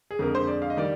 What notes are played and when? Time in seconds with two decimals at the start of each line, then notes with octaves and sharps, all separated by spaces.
0.11 G#4
0.19 F2 D3 G#3 A#4
0.35 C5
0.47 D5
0.62 F5
0.70 D#5
0.77 D#3 G3 D5